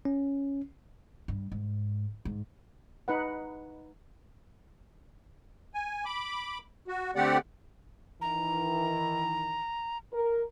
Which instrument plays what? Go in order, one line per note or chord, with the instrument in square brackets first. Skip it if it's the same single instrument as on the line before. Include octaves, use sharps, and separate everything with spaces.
[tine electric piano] C#4
[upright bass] G2
G#2
G#2
[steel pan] D#4 B4 F#5
[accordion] G#5
B5 D6
F#4
D3 A3 C4 G4 D5 F#5
[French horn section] D#3 E3 [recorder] A#5
[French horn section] A#4